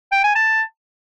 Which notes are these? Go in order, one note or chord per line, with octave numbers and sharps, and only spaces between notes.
G5
G#5
A5